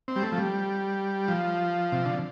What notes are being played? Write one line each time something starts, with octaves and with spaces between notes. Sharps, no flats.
C4
G3
A3
F3
G3
F3
C3
D3